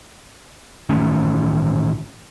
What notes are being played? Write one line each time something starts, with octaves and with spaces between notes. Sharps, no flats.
A1 D#3 A3 C#4